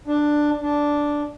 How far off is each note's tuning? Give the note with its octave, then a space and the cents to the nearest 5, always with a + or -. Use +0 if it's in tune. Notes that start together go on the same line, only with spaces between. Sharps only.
D4 +10
D4 -5